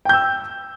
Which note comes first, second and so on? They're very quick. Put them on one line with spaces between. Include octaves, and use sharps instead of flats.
G5 G6 E6